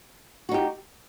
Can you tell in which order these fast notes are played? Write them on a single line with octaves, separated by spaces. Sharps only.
F#4 D#4 G4